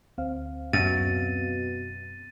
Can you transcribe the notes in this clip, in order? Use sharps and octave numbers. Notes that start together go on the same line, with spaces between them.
D2 C4 F5
F#2 B2 A6 D#7